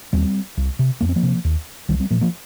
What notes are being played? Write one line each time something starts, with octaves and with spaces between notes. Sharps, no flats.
D#2 G3 C4
C2
C3
F2 A#3
C4
F3 A#3
C3
D#2
C2 D#3 G3
G3 C4
A#2 F3 A#3
F3 A#3